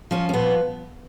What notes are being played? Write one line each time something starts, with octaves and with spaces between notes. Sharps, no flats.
F3 C#4
C#4
A#2 B3